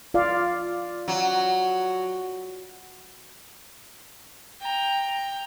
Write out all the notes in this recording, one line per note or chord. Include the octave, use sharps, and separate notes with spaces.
F4 D5 F5
F#3
G5 A#5